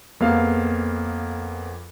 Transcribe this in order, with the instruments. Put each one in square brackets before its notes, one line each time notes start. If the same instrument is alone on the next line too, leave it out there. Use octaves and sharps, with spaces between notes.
[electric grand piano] F2 A#3 B3 G#4 F5